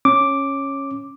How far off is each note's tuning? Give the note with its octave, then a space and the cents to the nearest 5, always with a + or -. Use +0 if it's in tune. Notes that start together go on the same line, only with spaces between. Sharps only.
C#4 -10 D6 +0